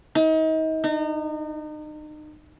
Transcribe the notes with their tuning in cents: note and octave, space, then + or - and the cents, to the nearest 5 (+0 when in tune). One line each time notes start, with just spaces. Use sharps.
D#4 +35
D#4 -35